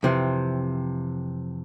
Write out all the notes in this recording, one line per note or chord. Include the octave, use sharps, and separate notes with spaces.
F2 C3 E3